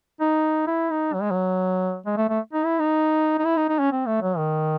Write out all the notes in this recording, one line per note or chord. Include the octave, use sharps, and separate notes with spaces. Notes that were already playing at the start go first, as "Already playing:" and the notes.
D#4
E4
D#4
F#3
G#3
F#3
G#3
A3
A3
D#4
E4
D#4
D#4
E4
D#4
D#4
C#4
C4
A3
F#3
D#3